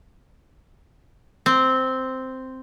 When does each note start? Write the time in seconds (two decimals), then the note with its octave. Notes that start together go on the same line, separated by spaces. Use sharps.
1.46 C4